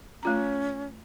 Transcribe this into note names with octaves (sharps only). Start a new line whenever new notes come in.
A3 C#4 F4 A#5